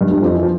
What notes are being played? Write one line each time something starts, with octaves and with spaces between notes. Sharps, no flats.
G2 G3
G2 G3
F2 F3
E3
F3